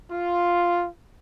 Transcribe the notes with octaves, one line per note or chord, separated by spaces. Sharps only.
F4